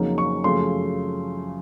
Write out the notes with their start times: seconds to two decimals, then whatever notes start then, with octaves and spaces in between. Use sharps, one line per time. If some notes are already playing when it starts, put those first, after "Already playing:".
Already playing: F2 C#3 F#3 A#3 D#4
0.18 C#6
0.44 F#2 C#3 F3 A3 C6